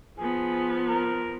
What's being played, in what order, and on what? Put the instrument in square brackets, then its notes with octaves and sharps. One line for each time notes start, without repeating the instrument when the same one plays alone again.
[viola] F3 B3 [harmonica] G#4
[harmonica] A#4